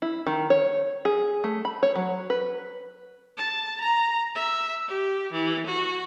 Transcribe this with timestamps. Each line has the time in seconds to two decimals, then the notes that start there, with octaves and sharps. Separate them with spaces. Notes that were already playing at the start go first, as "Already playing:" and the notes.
0.02 E4
0.27 D#3
0.50 C#5
1.05 G#4
1.44 A3
1.65 B5
1.83 C#5
1.95 F#3
2.30 B4
3.37 A5
3.81 A#5
4.35 E5
4.88 G4
5.32 E3
5.66 F#4